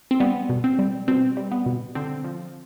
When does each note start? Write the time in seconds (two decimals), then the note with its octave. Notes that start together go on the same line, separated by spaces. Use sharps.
0.11 C4
0.20 G3 B3
0.49 B2
0.64 C4
0.79 G3
1.08 B2 C4
1.37 G3
1.52 B3
1.66 B2
1.95 D3 C4
2.24 F3